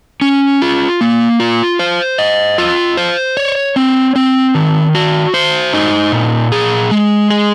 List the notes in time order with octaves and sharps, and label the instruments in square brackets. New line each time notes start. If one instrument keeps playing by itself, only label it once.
[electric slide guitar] C#4
F4
A#3
F4
C5
D#5
F4
C5
C#5
C4
C4
D#3
F#4
C5
D#4
A#2
G#4
G#3
G#4